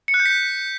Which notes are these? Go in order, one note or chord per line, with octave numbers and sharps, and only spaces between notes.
C#7
F#6
G6
B6